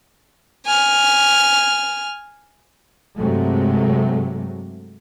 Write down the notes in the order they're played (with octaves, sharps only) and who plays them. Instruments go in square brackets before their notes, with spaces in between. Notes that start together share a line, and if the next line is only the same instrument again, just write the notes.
[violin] G#5 F6
[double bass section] G2 C3 F#3 G#3 A3